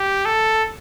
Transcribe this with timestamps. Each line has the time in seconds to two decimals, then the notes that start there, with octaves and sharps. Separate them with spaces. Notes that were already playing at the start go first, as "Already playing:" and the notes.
Already playing: G4
0.25 A4